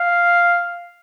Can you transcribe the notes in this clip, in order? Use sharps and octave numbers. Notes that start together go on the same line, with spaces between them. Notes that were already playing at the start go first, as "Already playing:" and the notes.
Already playing: F5